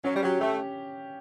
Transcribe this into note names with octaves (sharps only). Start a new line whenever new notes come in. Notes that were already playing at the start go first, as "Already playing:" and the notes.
F#3 C#4
G3
F#3 G4
A3 G4